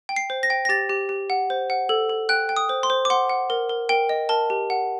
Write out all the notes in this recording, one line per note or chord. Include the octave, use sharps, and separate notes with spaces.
G5
C7
C5
A#6
G5
A#6
G4 A6
G4
G4
F#5
C5
F#5
A4
A4
G5 F#6
G5
D#6
C5
C6
C5
D6
F#5 C6
F#5
A#4
A#4
A#4 G5
D#5
A#4 A5
G4
F#5